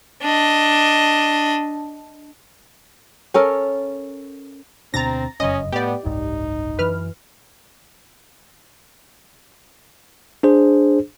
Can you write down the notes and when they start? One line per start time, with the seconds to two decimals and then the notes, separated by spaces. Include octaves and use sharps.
0.22 D4 D#5
3.34 C#4 A4 A#4
4.94 D2 B2 C4 D4 A#5 A6 A#6
5.40 F1 F#2 C#3 C#4 D#5
5.73 A2 B3 G4 D5
6.05 F#1 C2 G#2 D#4
6.79 F#2 E3 B4 F6
10.43 D4 G#4 C5